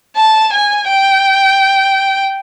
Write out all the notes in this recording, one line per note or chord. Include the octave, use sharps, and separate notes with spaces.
A5
G#5
G5